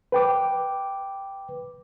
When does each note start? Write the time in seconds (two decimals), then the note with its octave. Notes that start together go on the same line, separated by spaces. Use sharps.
0.12 B4 G5 D6